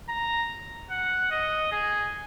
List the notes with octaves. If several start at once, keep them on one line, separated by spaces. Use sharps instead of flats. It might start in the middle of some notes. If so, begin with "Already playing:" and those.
A#5
F#5
D#5
G#4